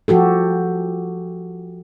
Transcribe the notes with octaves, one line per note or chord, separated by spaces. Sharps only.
F3 F#4 G4 A4